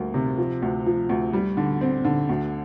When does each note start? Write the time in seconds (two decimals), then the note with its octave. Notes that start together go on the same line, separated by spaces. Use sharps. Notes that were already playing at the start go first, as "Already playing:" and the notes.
Already playing: D2 G3 A#3
0.14 C3
0.38 F3
0.62 D2
0.86 F3
1.09 D2
1.33 G3
1.57 D3
1.81 C4
2.05 D3
2.29 D2